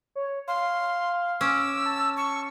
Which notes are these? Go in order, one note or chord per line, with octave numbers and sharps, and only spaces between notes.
C#5
F5 C6
C#4 D6 E6
A5
C#6